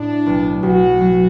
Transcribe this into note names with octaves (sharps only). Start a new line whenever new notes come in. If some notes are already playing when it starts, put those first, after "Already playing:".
Already playing: A2 D4
B1
B1 F#4
F#3